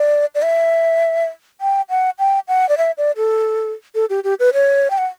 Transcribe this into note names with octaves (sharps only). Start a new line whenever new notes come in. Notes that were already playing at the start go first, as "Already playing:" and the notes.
Already playing: D5
D5
E5
G5
F#5
G5
F#5
D5
E5
D5
A4
A4
G4
G4
B4
C#5
G5
F#5